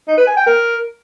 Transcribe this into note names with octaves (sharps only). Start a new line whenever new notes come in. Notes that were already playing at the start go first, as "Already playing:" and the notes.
D#4
B4
G#5
G5
A#4